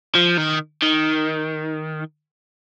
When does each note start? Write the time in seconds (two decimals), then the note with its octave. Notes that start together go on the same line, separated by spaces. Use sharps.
0.15 F3
0.38 D#3
0.82 D#3